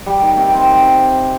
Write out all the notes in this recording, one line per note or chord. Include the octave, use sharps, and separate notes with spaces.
G3
D#3
C3
C4